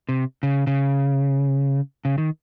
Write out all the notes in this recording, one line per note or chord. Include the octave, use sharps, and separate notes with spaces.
C3
C#3
C#3
C#3
D#3